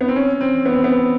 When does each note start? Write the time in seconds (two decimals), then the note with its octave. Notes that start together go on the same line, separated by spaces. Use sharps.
0.01 B3
0.08 C4
0.16 C#4
0.41 C4
0.66 B3
0.74 C4
0.84 B3